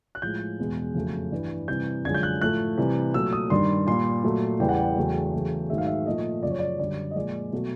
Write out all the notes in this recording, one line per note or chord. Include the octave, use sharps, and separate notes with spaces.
F#6
A2 F3 G#3 G6
E2 B2 G#3
F2 C#3 F#3 A3
G2 E3 G3
C3 E3 G3 G6
F#2 D3 F3 G#3 G#6
G6
F#6
A2 F3 A3 F#6
C3 E3 G3
A#2 F#3 A3 E6
D#6
G2 D#3 G3 C6
A#2 G3 C6
A#2 F#3 A3
E2 C#3 E3 G3 G5
F#5
G5
E2 C#3 F#3 A3
E2 C#3 F#3 A3
G#2 D#3 F#3 A3 E5
F5
E5
A#2 F3 A3 D#5
F#2 C#3 F3 D5
C#5
D5
F#2 D3 G3 D5
D#5
A#2 F3 G#3 D5
B2 F#3 A3